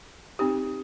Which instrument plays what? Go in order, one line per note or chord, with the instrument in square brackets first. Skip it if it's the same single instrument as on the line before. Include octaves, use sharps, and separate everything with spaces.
[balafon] C4 D#4 G4